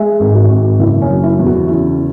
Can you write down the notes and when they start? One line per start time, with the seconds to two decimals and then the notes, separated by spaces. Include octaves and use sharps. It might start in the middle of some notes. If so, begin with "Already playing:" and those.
Already playing: G#3 E5
0.20 G#1
0.35 F#4
0.50 G#1
0.80 F#1 E4
1.01 C#4
1.09 F#3
1.23 E4
1.39 E2
1.46 F#4
1.68 C#3 E4